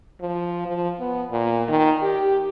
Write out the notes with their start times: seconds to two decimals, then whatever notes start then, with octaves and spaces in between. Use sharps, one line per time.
0.21 F3
0.67 F3
1.00 B3
1.32 A#2
1.69 D#3
2.02 G4